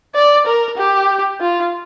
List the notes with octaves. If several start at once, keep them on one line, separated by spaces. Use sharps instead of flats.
D5
A#4
G4
F4